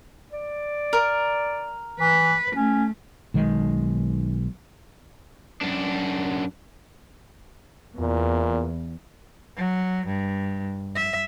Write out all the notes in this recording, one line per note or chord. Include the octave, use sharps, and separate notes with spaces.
D5
A#4
E3 B4
A3 C#4
B1 D#3 G#3
F#2 D4
E2 A#2
F#3
G2
E5